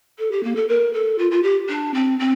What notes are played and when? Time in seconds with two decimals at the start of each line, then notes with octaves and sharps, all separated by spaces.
0.19 A4
0.32 G4
0.43 A#3
0.56 A4
0.68 A#4
0.94 A4
1.18 F4
1.31 F4
1.43 G4
1.69 D4
1.94 C4
2.19 C4